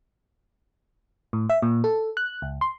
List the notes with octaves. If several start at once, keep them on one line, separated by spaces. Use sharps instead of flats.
A2
E5
A#2
A4
F#6
C#2
C6